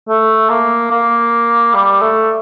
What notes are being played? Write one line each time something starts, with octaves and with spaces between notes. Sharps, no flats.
A3
A#3
A#3
G3
A3